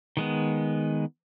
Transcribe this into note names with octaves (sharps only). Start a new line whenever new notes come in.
D#3 G#3 B3